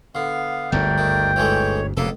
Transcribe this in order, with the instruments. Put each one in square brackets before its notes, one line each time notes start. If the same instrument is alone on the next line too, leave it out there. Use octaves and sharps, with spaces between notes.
[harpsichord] D3 [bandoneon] B3 F5
[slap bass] G1 D2 G#2 [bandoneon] A3 A#4 D5 [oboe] G5
[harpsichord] D#3
[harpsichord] E3 G#3 A3 [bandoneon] C#5
[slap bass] F1 B2 [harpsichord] C#2 A4 [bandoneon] A#3